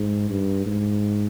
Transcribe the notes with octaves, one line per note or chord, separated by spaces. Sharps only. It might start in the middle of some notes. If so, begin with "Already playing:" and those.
Already playing: G#2
G2
G#2